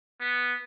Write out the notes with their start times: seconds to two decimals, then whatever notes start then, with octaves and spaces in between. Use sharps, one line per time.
0.21 B3